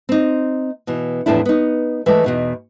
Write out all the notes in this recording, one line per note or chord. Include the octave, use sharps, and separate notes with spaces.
C4 D#4
B2 E3
E2 A2 F3 A3 D4 E4
B3 D#4
E3 G#3 A3
E2 B2 D#4